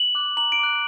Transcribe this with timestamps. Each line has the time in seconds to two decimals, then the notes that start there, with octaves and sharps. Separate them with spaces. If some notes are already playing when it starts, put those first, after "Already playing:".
Already playing: F#7
0.15 D6 F#6
0.37 A#5 F#7
0.52 D7
0.59 D6 F#6